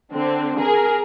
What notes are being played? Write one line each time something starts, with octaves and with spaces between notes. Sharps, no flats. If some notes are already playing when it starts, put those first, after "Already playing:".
D3 C4
G#4 A#4